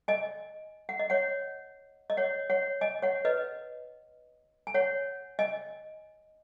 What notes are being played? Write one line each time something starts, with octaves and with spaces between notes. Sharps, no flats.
D#5 G#5
F#5
D#5
C#5 F#5
D#5
C#5 F#5
C#5 F#5
D#5 G#5
C#5 F#5
B4 D#5
G#5
C#5 F#5
D#5 G#5